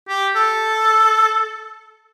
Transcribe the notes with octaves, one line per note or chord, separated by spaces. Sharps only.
G4
A4